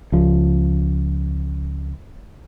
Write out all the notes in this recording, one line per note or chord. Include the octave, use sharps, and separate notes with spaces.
C#2 F3